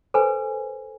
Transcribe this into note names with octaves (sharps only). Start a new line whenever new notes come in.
A4 B4 C5 G#5